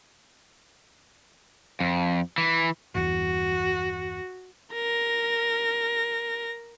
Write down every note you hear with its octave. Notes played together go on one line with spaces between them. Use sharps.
F2
E3
G1 E2 F#4
A#4 A#6